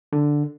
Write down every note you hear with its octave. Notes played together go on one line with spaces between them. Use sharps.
D3